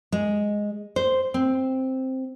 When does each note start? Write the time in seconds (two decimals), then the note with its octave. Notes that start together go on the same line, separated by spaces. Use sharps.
0.12 G#3
0.96 C5
1.34 C4